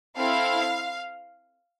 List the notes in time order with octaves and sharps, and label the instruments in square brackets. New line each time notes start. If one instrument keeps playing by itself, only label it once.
[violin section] C4 E4 A4 F5